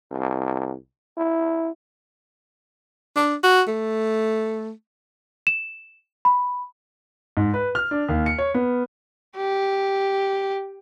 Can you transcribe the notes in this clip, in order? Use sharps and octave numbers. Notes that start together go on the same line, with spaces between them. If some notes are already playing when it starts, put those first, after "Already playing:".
C2
E4
D4
F#4
A3
E7
B5
G#2
B4
F6
D4
D#2
C#7
C#5
B3
G4